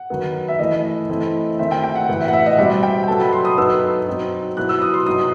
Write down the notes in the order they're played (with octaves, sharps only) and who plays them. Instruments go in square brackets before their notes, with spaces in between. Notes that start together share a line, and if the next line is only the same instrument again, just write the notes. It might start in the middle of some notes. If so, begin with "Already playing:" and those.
Already playing: [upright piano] F#5
[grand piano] D#3 F#3 B3
[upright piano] E5
[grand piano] E3 A3 E4 [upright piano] D#5
[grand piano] E3 A3 C4 E4 A4
[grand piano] D#3 A3 C4 [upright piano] E5
[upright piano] G5
G5
F#5
[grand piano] A2 E3 B3
[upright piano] E5
F#5
E5
D#5
[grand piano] B2 G3 C4 [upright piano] E5
[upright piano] G5
G5
[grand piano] F#3 B3 F#4 A4 [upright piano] A5
[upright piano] B5
C6
D#6
[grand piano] B2 F#3 B3 D#4 A4 [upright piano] E6
[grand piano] F#3 C4 D#4
[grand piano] B2 F#3 B3 E4 [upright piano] F#6
[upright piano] E6
D#6
C6
[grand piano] C3 F#3 B3 D#4 [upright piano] D#6